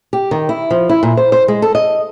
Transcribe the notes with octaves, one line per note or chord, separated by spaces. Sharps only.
G4
D#3
E4
F3
E4
A#2
C5
C5
G#3
A4
D#5